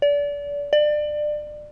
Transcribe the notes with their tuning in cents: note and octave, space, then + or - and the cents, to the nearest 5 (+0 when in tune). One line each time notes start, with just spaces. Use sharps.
D5 -30
D5 +25